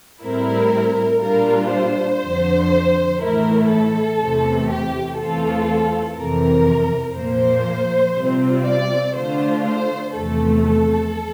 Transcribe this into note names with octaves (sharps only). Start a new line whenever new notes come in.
A2 G3 C4 E4 A#4
A#2 G3 D4 F4 A#4
C5
F2 D3 F3
A2 E3 A3 E4 A#4
A4
E2 C3 E3 A3
G4
E2 E3 A3 C4 F4 A4
F2 C3 E3 A#4
A#2 F3 A#3 C5
C3 G3 C4 F4
D5
D3 A3 D4 F4 C5
C5
E2 C3 F3 A3 A4
A4